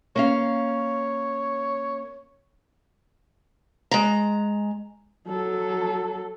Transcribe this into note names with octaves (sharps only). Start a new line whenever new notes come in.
A#3 C#4 C#5 F5
G#3 A#5
F#3 A4